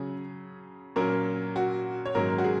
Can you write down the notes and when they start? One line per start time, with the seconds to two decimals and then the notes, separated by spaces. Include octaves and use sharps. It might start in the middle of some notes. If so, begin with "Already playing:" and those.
Already playing: C#3 F#3 C#4 G#4
0.96 A#2 F#3 A#3 C#4 A#4
1.56 F#4
2.06 C#5
2.15 G#2 D#3 F#3 A#3 C#4 A#4
2.38 F#4
2.44 G#4